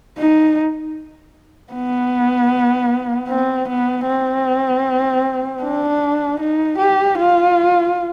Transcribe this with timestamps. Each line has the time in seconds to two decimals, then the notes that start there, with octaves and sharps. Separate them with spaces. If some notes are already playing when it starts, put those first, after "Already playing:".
0.18 D#4
1.73 B3
3.29 C4
3.68 B3
4.07 C4
5.63 D4
6.40 D#4
6.79 G4
7.18 F4